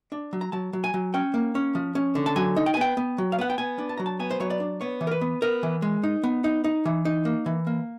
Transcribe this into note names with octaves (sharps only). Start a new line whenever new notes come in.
D4
F#3
A#5
F#3 A5
F#3
G#5
F#3
C#4 G5
A#3
C#4
F3
C#4
D3
A5
F#3 G#5
D#4
G5
G#5
B3 G5
B3
F#3
F5
B3 F#5
G5
B3 G#5
D4
A5
F#3 A#5
A5
B3 G#5
C5
F#3 C#5
D5
D4
B3 C#5
E3
A#4
B4
B3
B3 A#4
E3
G#3
D#4
B3
D#4
D#4
E3
D#4
A#3
E3
A#3